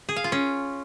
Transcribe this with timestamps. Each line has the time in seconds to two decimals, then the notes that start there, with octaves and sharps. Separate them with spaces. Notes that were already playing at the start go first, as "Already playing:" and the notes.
0.09 G#4
0.16 F5
0.24 F4
0.32 C#4